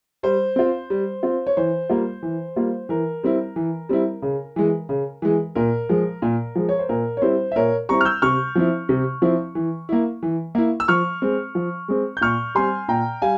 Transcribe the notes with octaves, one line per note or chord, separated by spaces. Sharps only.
G3 C5
C4 F4
G3
C4 F4
C#5
E3 C5
G3 A#3 F4
E3
G3 A#3 F4
E3 A#4
G3 C4 E4
E3
G3 C4 E4
C#3
E3 G#3
C#3
E3 G#3
A#2 A#4
F3 G#3
A#2
F3 G#3
C#5
C5
A#2 A#4
C#5
G3 C4 E4 C5
E5
A#2 A#4 C#5
G3 C4 E4 A#5 C#6
F6
E6 G6
C3 C#6 F6
F3 C4 E4
C3
F3 C4 E4
E3
A#3 E4
E3
A#3 E4
E6
F3 C#6 F6
G#3 C4
F3
G#3 C4
G6
A#2 C#6 F6
G3 C4 G#5 C6
A#2 G5 A#5
G3 F5 G#5